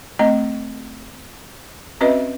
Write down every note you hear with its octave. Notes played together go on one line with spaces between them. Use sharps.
A3 C4 D#5
C4 C#4 F#4 B4 D#5 E5